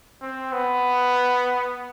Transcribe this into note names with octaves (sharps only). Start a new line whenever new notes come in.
C4
B3